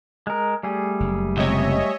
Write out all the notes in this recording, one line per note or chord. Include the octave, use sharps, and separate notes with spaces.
G#3 A#4
G3 A3 G#4
F#1
C#2 C3 C#5 D#5 E5